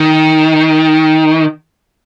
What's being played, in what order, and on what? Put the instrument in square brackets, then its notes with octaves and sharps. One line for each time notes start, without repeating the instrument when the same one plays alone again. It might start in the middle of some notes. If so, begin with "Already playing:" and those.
Already playing: [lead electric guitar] D#3